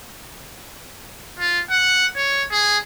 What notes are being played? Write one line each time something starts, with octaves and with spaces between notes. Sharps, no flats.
F4
F#5
C#5
G#4